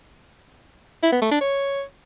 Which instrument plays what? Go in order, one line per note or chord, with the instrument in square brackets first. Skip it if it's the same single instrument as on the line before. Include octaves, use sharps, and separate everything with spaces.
[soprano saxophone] E4
B3
A3
D4
C#5